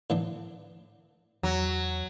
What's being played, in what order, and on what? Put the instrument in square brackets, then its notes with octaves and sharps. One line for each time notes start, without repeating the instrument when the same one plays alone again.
[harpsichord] A2 E3 D4
[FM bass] E2 [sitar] F#3